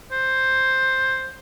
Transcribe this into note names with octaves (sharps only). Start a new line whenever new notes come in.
C5